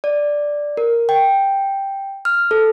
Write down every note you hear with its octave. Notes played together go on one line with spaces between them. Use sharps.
D5
A#4
G5
F6
A4